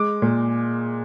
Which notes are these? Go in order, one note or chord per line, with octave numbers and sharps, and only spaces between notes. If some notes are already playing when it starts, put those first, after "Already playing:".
Already playing: G#3 D6
A#2